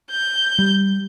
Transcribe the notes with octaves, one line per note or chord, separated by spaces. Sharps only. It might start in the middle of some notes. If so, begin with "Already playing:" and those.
G6
G3